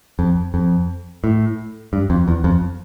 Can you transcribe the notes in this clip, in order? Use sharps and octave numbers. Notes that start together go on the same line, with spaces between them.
F2
F2
A2
G2
F2
E2
F2